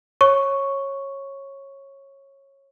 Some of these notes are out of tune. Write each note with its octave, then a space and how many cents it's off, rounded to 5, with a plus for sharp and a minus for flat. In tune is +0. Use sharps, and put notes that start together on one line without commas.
C#5 -20 C#6 +0